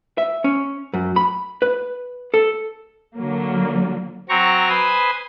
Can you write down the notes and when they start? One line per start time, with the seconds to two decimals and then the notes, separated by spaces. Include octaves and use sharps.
0.18 E5
0.44 C#4
0.93 F#2
1.16 B5
1.62 B4
2.34 A4
3.17 D3 F#3 A#3
4.29 F#3 C4 A#5 C#6
4.69 B4 C5 G#5 B5 D#6